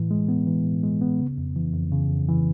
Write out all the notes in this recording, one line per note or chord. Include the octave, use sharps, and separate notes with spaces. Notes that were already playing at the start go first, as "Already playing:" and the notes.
Already playing: A2 E3
G#3
B3
E3
A2
G#3
B3
C#3
F2
E3
F2
C#3
F2
E3